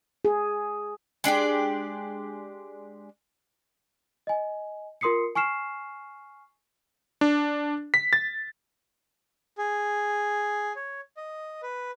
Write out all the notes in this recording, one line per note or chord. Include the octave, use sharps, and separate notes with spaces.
G#4
G#3 D4 G4 D5
D#5 G#5
F4 A#4 C6 D#6 C7 C#7
G#5 C#6 F6 C7 E7
D4
B6
A6
G#4
C#5
D#5
B4